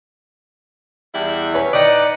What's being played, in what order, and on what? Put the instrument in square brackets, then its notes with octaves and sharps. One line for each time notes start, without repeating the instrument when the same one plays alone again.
[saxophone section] E2 G3 E4
[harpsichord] C#4 B4
[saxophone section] D#4 B4 D5 [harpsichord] D#5 F#5 G5